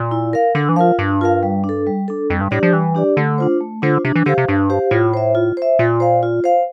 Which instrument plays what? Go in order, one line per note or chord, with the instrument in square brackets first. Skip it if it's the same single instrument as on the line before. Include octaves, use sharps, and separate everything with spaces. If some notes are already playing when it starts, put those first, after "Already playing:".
Already playing: [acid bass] A#2
[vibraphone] E4
A#4 F5
[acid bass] D3 [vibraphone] D4
[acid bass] E3
[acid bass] F3 [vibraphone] F4 A#4 F5
[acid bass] G2 [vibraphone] D4
[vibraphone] F4 A#4 F5
G3
D4
A4
G3
D4 A4
[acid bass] F2 [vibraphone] G3
[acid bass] G2
[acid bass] A2 [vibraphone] D4 G4 D5
[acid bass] F3
[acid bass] E3 [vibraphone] G3
[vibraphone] D4 G4 D5
[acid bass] D3 [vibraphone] A3
[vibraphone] D4 F4 C5
A3
[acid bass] D3 [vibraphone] D4 F4 C5
[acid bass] C3 [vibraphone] D4
[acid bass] E3
[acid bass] D3 [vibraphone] G4 C5 F5
[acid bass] C3
[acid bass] G2 [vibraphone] D4
[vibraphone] G4 C5 F5
[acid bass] A2 [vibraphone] F4
[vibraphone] C5 E5
F4
C5 E5
[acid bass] A#2 [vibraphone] F4
[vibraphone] C5 F5
F4
C5 F5